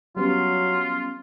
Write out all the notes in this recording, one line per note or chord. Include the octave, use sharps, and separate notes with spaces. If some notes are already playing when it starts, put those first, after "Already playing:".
F#3 G3 B3 C#4 F4